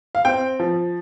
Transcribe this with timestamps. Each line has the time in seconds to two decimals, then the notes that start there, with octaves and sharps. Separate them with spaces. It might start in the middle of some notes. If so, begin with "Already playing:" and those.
0.15 F5
0.25 C4 G5
0.60 F3